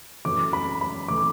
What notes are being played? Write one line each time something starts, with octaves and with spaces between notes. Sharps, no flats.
F#2 E3 A3 D6
B5
B5
E3 A3 D6